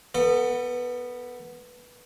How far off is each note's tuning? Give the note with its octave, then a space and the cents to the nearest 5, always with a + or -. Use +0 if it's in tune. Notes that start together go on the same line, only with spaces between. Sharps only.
B3 -5 A4 +35